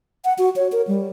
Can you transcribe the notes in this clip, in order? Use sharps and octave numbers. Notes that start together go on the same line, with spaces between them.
F#5
F#4
C#5
A#4
G3